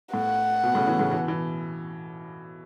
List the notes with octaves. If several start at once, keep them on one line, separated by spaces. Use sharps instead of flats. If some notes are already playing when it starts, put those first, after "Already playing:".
A2 F#5
B2
A2 C#3
B2 E3
A2 C#3
B2 E3
B2 E3